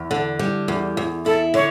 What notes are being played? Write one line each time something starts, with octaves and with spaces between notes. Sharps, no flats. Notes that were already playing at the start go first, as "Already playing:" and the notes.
Already playing: E2
D3
G3
E2
E2
E4 A4
D3 C#5